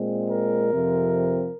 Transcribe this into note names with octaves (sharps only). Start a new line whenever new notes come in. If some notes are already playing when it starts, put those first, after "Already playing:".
Already playing: A#2 G#3 C4
A#4
F2 C3 F3 C4